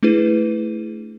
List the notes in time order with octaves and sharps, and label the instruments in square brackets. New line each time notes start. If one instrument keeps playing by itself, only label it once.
[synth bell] A3 D4 E4 G#4 B4 D#7